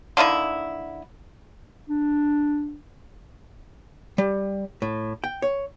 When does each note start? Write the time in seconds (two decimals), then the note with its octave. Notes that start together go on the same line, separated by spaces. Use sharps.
0.17 D3 A#3 D#4 E4
1.89 D4
4.18 G3
4.82 A2
5.24 G5
5.42 C#5